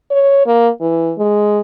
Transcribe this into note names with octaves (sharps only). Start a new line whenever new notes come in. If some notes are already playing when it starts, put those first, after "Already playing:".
C#5
A#3
E3
G#3